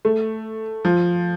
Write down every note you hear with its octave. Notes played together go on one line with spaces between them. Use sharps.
A3
F3